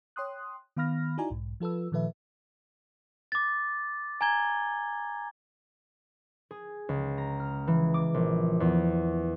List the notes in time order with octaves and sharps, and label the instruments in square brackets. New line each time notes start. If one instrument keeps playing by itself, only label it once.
[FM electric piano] C#5 G5 C6 D#6 F#6
D#3 B3 F5 B5 F6 A#6
D#4 E4 F#4 D5 G#5 A#5
B1 G#2
F3 F4 A4 B4 E6
A#2 D#3 F3 A4 B4 E5
[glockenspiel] D6 A6
G#5 A#5 G#6 G7
[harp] G#4
C#2
A#5
F6
E3
D6
A#1
E2